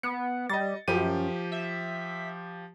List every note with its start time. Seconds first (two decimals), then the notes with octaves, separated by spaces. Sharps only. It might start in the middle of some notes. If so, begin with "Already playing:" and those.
0.03 B3 C#7
0.50 G3 D#5 A6
0.88 F#2 F3 G4 D#7
1.52 E5